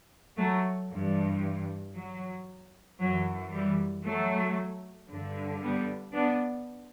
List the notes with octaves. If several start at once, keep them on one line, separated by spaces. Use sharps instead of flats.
F#3 A3
G2 E3
F#3
F#2 E3 F#3
E3 G3
F#3 A3
G2 D3
G3 B3
B3 D4